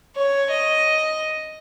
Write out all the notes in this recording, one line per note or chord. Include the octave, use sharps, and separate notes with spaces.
C#5
D#5